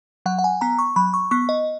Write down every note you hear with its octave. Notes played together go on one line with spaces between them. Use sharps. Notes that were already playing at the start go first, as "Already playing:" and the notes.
F#3 F#5
F#5
G#5
B3 A#5
C#6
F#3 B5
C#6
B3 C#6
D#5